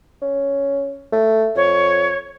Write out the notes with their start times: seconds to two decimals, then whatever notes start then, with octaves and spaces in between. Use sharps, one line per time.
0.22 C#4
1.12 A3
1.56 F2 C#5